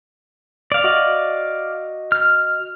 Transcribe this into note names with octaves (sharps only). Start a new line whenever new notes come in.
D5 F5
F#4 D#5
F6